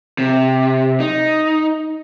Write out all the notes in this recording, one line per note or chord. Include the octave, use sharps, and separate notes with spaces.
C3
D#4